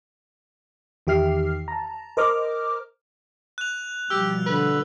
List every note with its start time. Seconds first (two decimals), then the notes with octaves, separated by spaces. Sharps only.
1.07 E2 D#3 G4 E5 F6 C7
1.68 A5 A#5
2.17 A#4 C5 D#5 A#5 D6 F6
3.58 F#6 F7
4.10 B2 F3 G3 G4 E6
4.46 D3 B4